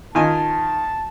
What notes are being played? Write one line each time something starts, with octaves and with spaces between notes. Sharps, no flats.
D#3 F4 G#5 A5